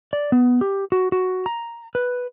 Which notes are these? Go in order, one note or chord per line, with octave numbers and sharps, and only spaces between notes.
D5
B3
G4
F#4
F#4
A#5
B4